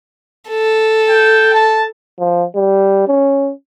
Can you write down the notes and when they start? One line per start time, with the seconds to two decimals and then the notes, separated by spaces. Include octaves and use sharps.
0.49 A4
1.09 G5
1.53 A5
2.19 F3
2.55 G3
3.08 C#4